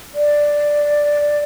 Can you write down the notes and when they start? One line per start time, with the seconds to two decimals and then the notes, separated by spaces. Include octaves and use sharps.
0.15 D5